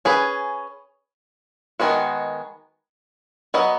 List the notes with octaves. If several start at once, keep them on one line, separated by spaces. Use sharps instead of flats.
C#4 G#4 B4
D#3 G#3 B3 F#4
F#3 B3 F#4 B4 D#5